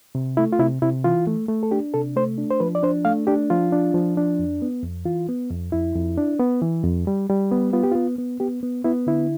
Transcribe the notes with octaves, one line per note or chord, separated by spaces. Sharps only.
C3
A3 E4
F4
C3 E4
C3 E4
E3 F4
A3
A3
A4
D4 G4
C3 A4
A3 C5
D4
C5
F3 B4
D5
D4 C5
A3 F5
D4 G4
F3 F4
D4
F3
D4
F2
B3
F2
E3 F4
B3
F2
F2 E4
F2
D4
B3
E3
F2
G3
G3
B3
B3 F4
G4
B3 F4
B3
B3 G4
B3
B3 E4
D3 E4